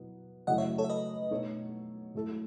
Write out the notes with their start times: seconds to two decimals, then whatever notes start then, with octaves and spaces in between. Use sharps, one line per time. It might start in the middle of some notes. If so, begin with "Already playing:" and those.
Already playing: B2 F#3 B3 E4
0.47 F#2 C#3 F#3 A3 E4 D#5 F#5
0.58 C#5 E5
0.78 A4 C#5
0.84 E5
0.89 B4 D#5
1.31 B2 A3 D#4 A4 C#5
2.15 G#2 F#3 A3 E4 A4